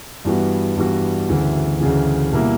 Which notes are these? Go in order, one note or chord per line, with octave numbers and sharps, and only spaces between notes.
G2 E3 G3 B3 F#4
G2 E3 G3 B3 F#4
D2 C#3 E3
D2 C#3 E3
B2 G3 A#3 E4